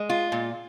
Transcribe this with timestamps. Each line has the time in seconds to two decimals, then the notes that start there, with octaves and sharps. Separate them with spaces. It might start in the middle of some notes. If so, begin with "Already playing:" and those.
Already playing: G#3
0.09 F4
0.32 A#2